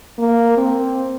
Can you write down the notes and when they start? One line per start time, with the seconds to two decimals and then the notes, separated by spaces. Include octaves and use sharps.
0.19 A#3
0.57 C4